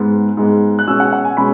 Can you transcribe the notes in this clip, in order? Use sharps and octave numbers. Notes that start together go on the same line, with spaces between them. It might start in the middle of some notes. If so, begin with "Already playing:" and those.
Already playing: G#2 G#3 B3
G#2 G#3 B3
F#6
B2 G#3 C#4 E6
F#5
F#5
G#5
B2 G#3 C#4 B5